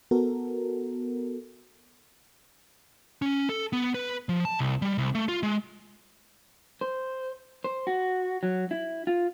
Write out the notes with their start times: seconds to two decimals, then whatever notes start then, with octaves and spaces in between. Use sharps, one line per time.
0.11 B3 F#4 A4 A#4
3.22 C#4
3.49 A4
3.73 B3
3.94 B4
4.29 F3
4.45 A5
4.59 C2
4.82 G3
4.98 C2
5.15 A3
5.28 F4
5.43 G#3
6.81 C5
7.64 C5
7.87 F#4
8.43 F#3
8.71 E4
9.07 F4